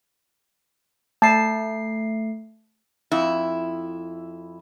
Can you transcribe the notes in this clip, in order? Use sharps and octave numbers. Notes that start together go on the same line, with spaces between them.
A3 A5 C7
F2 E4